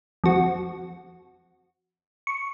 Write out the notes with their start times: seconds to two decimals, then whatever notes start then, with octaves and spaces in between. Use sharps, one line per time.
0.24 F2 F#4
2.27 C#6